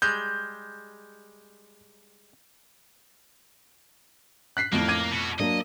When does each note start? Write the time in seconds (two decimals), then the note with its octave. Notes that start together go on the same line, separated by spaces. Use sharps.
0.02 G3 G#3 G6
4.57 F#6 B6 C7
4.72 F2 A2 F3 A#3
4.88 D6 G#6 D#7
5.12 B2 F#4
5.40 F#3 A#3 D4 D#5